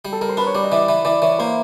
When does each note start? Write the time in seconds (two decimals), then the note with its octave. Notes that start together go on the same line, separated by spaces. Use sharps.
0.05 G3
0.13 A4
0.21 G3 A#4
0.29 C5
0.37 D4 B4
0.47 C#5
0.55 G3 D5
0.64 D#5
0.72 E3 D5
0.89 E3
1.05 E3 D5
1.22 E3 C#5
1.39 A#3 C5